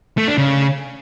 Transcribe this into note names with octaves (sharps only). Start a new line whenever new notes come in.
A3
D4
C#3